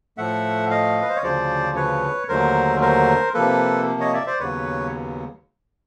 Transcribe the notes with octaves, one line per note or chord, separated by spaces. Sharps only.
A2 F3 A3 E5 F#5
D#5 F5
B4
C5
C#5
D2 C#3 F3 C5 D5
B4 C#5
D#2 D3 F#3 A3 A#4 C5
A#4 C5
C3 F3 A#3 A4 B4
C#5 D#5
D5 E5
C5 D5
D#2 C#3 F#3 B3 B4 C#5